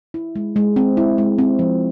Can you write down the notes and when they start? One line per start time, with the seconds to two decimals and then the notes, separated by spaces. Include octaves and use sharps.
0.14 E4
0.36 G#3
0.56 G#3
0.76 C4
0.97 E4
1.18 G#3
1.39 C4
1.59 F3